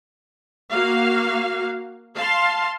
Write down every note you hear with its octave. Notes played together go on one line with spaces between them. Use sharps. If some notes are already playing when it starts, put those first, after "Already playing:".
A#3 F#4 F5
F5 A5 C6